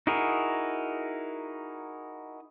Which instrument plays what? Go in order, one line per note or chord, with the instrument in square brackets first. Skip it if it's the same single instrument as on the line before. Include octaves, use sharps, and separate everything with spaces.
[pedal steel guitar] D#4 E4 F#4 G#4 A#4